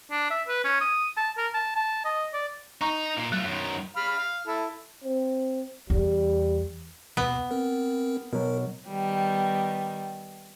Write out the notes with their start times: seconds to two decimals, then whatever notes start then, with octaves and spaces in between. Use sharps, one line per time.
0.11 D4
0.31 E5
0.48 B4
0.64 C#4
0.81 D#6
1.17 A5
1.37 A#4
1.54 A5
1.76 A5
2.05 D#5
2.33 D5
2.81 D#4 A#5 C#6
3.17 A#2
3.32 F#3 A3 F4
3.44 F#2 D#3
3.97 F5 B5 F6
4.19 F5
4.47 E4 A4
5.04 C4
5.90 E2 G3
7.17 D#2 B2 B3
7.51 C4 A#4
8.33 B2 F#3 A#4
8.87 D#3 G3 B3